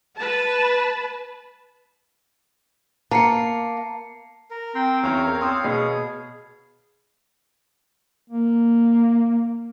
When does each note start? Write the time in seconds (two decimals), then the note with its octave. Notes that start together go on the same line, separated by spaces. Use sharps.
0.17 B4 A5
3.11 A#3 A5 C7 C#7
4.51 A#4
4.75 C4 A#4 G5 C6
5.03 E2 C#4 C#5 F5 A#5
5.27 A#4
5.41 C4 C6 D#6 E6
5.64 B2 G#4
8.30 A#3